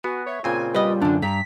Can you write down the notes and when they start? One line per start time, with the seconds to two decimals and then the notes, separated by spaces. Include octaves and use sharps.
0.04 B3 F#4 G#5
0.26 C#5 E5
0.44 A#2 C#3 C4 F4 G#5
0.74 G3 B4 D#5
1.02 F#2 D3 D4
1.22 G2 A#5 B6